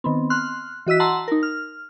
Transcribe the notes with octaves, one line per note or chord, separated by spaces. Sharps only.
D#3 B3 C4
C6 F6 F#6
E3 F#4 D#5 E6 B6
F#5 A5 A#5 C6 E6
D#4 A#4
F6